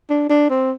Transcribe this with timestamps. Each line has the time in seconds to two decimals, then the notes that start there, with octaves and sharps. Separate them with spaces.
0.10 D4
0.30 D4
0.50 C4